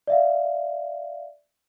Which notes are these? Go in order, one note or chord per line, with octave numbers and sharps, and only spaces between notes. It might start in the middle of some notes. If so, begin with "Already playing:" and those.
D5 E5 F5